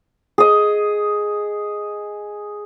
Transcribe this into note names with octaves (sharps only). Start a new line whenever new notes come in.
G#4 D#5